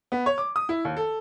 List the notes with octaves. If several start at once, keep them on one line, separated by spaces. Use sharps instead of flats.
B3
C#5
D6
D#6
E4
D#2
A4